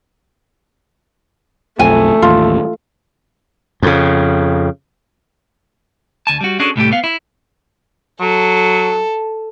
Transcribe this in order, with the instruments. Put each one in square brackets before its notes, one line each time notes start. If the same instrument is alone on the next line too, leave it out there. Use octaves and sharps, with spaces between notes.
[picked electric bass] B1 F2 F3 [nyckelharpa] A3 [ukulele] G#5
[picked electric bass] A1 D#2 [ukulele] F4
[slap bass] F2 C#3
[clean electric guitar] D2 G#5 A5
G3 F#4
C#4 D4 F#4 G#4 A4
C2 A2 A3 G4
B3 F5
E4
[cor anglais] F#3 [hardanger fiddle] A4